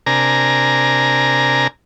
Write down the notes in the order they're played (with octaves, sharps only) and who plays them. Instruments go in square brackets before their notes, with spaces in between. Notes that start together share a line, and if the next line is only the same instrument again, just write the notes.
[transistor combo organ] C3 D4 A#4 G#5 A#5